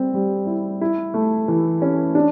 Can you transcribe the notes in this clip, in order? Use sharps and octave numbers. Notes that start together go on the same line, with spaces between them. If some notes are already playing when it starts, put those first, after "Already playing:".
Already playing: G3 C4
G3
E4
E4
A3
E3
C#4
D4